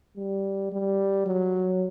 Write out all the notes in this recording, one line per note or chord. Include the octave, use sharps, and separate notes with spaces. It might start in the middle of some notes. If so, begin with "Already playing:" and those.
G3
G3
F#3